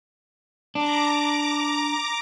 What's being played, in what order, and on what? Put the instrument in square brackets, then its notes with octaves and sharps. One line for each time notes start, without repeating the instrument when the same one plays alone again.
[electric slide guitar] D4 [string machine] A#5 D6